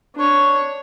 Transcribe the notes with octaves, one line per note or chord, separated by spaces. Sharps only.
D4 C#5